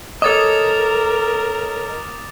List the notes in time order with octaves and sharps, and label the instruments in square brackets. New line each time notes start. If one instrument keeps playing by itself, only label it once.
[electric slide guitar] A4 C#5 D#5 [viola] A#4 [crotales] D6 D#6 A6